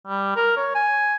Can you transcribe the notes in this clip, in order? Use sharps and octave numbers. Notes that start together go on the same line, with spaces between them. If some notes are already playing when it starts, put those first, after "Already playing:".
G3
A#4
C#5
G#5